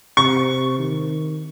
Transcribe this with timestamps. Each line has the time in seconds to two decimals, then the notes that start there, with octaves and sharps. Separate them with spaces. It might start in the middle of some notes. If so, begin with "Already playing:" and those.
0.17 C3 C#6
0.79 D#3